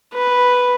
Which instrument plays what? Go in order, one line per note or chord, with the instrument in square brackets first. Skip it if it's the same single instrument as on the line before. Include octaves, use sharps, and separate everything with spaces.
[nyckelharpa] B4